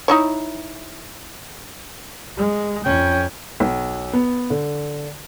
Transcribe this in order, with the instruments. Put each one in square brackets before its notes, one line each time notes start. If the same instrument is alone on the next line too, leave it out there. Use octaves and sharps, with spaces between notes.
[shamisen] D#4 E4 C#5
[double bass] G#3
[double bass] F2 [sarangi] C#4 [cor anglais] G5
[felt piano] B1
B3
D3